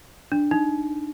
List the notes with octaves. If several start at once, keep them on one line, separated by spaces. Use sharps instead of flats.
D4
D#4